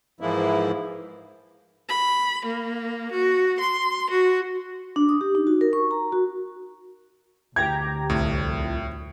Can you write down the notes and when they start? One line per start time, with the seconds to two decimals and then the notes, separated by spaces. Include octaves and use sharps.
0.21 G#2 E3 F3 G#3 A#3 E4
1.89 B5
2.44 A#3
3.11 F#4
3.59 C6
4.10 F#4
4.96 D4
5.09 D#6
5.21 G4
5.35 D#4
5.47 F#4
5.61 A#4
5.73 C#6
5.91 A#5
6.12 F#4
7.56 D2 G4 G5 A#5 G#6
8.10 C2 F2 A2